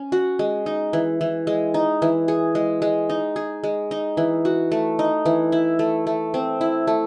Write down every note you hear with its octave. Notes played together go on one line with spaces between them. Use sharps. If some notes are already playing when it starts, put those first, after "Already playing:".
Already playing: C#4
F#4
G#3
D#4
E3
E3
G#3
D#4
E3
G#4
G#3
G#3
D#4
G#4
G#3
D#4
E3
F#4
A3
D#4
E3
E4
A3
A3
C4
E4
A3